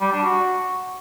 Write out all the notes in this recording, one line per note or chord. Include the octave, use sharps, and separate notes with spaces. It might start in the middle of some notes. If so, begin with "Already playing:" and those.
G3
D4
F#4